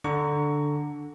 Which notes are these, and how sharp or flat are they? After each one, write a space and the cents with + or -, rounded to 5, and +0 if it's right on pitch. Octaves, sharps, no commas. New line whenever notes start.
D3 +0 A#5 -10 C#6 +20